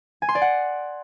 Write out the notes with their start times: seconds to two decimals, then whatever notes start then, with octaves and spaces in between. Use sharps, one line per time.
0.22 G#5
0.29 C6
0.35 D5
0.42 F#5